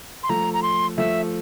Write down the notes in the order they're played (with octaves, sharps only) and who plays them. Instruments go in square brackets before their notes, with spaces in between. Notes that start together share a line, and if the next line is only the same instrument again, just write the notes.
[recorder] C6
[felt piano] F3 A3 [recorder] A#5
[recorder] A#5
C6
[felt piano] F3 A3 [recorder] E5